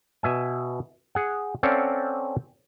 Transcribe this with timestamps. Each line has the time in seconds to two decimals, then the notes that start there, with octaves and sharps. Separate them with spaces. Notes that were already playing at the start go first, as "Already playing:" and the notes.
0.23 B2 E5 G#5
1.15 G#4 F#5
1.63 C4 C#4 A4 D5 F5 F#5